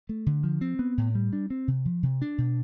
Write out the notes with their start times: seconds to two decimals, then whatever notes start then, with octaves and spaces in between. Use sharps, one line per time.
0.09 A3
0.26 D3
0.44 F3
0.61 C4
0.79 B3
0.98 A2
1.15 G3
1.33 D4
1.50 C4
1.68 C3
1.85 F3
2.03 C3
2.22 D4
2.38 B2